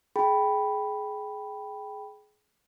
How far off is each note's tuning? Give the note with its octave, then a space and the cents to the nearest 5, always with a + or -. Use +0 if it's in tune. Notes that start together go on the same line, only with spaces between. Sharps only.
G#4 +25 G5 +0 B5 +0